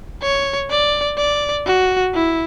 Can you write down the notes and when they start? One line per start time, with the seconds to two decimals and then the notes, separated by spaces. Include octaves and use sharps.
0.22 C#5
0.70 D5
1.18 D5
1.66 F#4
2.14 E4